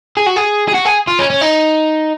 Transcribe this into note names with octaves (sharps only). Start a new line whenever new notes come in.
G#4
F#4
G#4
G#4
F#4
G#4
F4
C#4
C#4
D#4